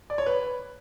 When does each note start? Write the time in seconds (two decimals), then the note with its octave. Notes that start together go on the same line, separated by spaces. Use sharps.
0.10 D5
0.18 C#5
0.26 B4